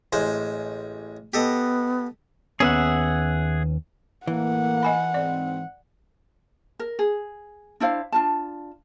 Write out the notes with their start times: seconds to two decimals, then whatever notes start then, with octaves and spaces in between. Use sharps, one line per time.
0.13 A1 G#3 C5
1.34 B3 G4 A4 D#5
2.60 D#2 B3 C#4 G#4 E5 F#5
4.27 A2 E3 A#3 F#5
4.83 D#5 G#5 B5
5.14 G#2 C4 D5
6.79 A#4
6.99 G#4
7.80 D4 E4 C5 F5
8.12 D4 F4 A5